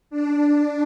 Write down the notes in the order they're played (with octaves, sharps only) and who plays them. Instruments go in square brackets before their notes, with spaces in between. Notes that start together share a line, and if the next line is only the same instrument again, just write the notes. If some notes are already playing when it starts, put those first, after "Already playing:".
[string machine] D4